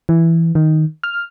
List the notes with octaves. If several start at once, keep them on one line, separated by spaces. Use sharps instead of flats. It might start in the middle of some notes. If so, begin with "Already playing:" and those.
E3
D#3
F6